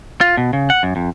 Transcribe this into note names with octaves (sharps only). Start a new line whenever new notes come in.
F4
B2
C#3
F#5
F#2
F2